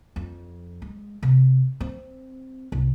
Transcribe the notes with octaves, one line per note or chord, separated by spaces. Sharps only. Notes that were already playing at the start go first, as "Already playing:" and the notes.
F2
G#3
C3
C4
C2